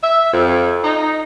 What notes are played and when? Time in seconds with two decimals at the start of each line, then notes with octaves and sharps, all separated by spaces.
0.02 E5
0.32 F2
0.83 D#4